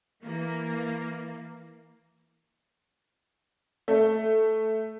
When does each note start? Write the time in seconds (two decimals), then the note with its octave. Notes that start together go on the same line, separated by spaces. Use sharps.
0.23 E3 A#3
3.88 A3